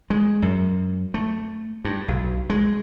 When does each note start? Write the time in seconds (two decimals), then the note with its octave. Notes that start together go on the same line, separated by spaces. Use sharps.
0.10 G#3
0.42 F#2
1.14 A3
1.85 G2
2.08 B1
2.50 G#3